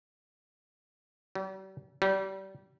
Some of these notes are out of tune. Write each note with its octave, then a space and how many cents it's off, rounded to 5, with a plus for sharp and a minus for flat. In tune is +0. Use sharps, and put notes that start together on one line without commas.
G3 -45
G3 -30